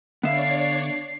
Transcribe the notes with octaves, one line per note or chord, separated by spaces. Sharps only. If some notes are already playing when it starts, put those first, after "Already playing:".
D3 B3 D4 C#5 D5 E5 F5 C7